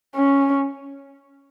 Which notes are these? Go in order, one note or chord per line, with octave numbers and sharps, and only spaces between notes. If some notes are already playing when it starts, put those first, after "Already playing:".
C#4